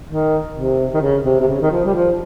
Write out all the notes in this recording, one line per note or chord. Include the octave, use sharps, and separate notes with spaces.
D#3
C3
D#3
C#3
C3
C3
C#3
D#3
F3
G3
F3